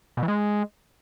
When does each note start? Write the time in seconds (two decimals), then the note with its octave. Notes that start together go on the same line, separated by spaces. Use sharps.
0.17 B2
0.23 E3
0.28 G#3